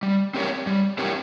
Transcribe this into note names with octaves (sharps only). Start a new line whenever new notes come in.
G3
C4 G4 A#4 C#5
G3
C4 G4 A#4 C#5